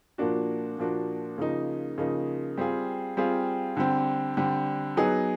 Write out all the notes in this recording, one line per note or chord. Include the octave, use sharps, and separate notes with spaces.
A#2 F3 A#3 D4 F#4
A#2 F3 A#3 D4 F#4
C#3 F3 A#3 D#4
C#3 F3 A#3 D#4
G3 C4 F4 G#4
G3 C4 F4 G#4
D3 G3 C4
D3 G3 C4
F#3 B3 D#4 G#4